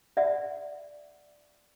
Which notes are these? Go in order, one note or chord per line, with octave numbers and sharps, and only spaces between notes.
D5 E5 F#5